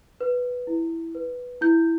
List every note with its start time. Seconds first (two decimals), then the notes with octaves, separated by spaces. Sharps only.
0.21 B4
0.67 E4
1.15 B4
1.61 E4 G6